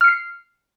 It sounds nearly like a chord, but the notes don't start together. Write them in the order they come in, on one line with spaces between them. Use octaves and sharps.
F6 C#7 C7